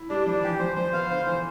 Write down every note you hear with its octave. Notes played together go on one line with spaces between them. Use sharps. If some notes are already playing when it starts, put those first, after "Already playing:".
Already playing: E4
G3 D4
F3 D4
E3 G4
F3 C5
F3 C5
B3 F5
D3 C5
E3 C5